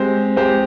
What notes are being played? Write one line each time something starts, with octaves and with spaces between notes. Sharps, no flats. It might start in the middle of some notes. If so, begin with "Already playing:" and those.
Already playing: G#3 C4 G4 C5
G#3 C4 G4 C5